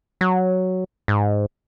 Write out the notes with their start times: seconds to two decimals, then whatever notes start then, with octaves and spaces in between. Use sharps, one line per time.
0.21 F#3
1.08 G#2